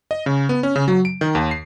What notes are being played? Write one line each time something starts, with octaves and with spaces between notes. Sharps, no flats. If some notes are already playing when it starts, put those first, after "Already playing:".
D#5
C#3
B3
C#4
C#3
F#3
D7
D#3
D#2
C7